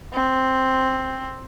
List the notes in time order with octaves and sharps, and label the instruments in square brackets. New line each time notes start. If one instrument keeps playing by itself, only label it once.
[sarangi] C4